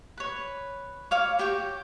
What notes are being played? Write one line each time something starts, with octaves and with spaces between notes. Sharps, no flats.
B4 C#5
C#5 F5 D6
F#4 G4 C#5 G5